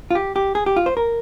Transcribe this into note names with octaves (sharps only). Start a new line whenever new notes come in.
F4
G4
G4
G#4
G4
F4
C5
A#4